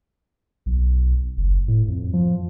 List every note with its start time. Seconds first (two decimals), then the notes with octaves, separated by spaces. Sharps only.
0.66 B1
1.37 F#1
1.68 A2
1.88 F2
2.13 F3